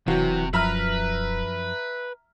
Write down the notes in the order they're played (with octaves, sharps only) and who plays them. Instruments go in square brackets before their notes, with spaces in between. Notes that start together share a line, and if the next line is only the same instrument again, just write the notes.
[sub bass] E1 [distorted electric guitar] C3 [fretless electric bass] E3 [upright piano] F#3 F#4
[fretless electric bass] F#2 F3 [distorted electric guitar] B4 [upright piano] E5 A#5 F6